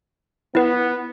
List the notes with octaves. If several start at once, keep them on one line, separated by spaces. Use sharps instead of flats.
B3 E4 B4